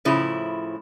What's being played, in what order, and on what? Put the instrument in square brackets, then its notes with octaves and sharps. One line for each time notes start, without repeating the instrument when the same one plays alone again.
[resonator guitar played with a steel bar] A2 C#3 F3 E4